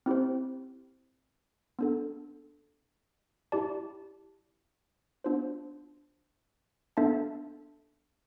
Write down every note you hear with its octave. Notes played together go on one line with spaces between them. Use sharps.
C4 E4 G4 C5
B3 D4 A4
E4 G4 D5 A5
B3 D4 F4 C5
B3 D4 A4 E5 A5